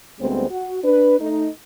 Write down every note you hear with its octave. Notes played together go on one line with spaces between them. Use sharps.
D2 G3 G#3 B3 C4 C5
F#4
D4 B4
A3 D#4